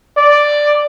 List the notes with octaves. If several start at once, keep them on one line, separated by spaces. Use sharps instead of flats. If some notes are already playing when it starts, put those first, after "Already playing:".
D5